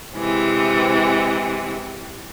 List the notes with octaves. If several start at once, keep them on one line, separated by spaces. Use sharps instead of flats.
C3 E3 G#3